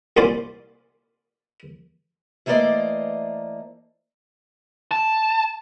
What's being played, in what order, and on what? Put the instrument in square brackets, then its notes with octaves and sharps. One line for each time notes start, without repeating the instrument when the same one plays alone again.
[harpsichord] C2 A#2 C#4 C5 D5 B5
[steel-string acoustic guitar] E3 A3 A#3 C5 D5 D#5
[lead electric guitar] A5